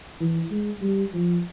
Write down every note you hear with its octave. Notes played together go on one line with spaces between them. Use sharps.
E3
G#3
G3
F3